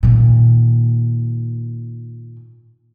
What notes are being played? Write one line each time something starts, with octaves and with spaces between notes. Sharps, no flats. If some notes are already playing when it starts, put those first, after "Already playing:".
A#2 D#3